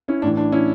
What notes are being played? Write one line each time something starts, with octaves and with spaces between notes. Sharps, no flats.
C#4 E4
A2 E3 D4
D4
C#4 E4